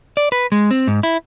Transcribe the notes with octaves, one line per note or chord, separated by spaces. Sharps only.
D5
B4
G#3
C4
G#2
E4